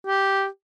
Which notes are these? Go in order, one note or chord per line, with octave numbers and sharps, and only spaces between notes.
G4